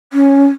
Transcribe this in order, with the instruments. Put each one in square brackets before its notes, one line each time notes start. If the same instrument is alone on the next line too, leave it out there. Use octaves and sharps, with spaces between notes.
[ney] C#4